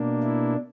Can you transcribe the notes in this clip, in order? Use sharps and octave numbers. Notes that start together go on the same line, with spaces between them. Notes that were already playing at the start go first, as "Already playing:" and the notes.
Already playing: B2 A#3 D4
E4